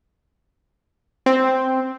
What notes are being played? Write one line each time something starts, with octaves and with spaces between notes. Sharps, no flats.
C4